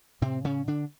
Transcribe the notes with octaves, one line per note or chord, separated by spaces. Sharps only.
A2 C3 C4
C#3 C#4
D3 D4